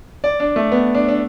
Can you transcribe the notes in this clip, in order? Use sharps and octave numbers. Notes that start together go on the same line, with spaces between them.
D5
D4
A3
B3
D4
D4